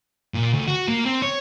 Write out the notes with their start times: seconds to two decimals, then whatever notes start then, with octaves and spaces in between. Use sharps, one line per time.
0.34 A#2
0.54 D2
0.68 F#4
0.88 A#3
1.05 C4
1.22 C#5